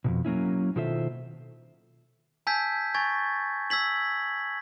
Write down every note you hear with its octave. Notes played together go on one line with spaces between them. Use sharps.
F2 G#2 B2
F#3 A#3 C#4 E4
B2 D#3 F4 A4 C5 E5
G#5 A5 E6 G6 G#6 B6
G#5 C#6 G#6 A6
E6 G#6 B6 F#7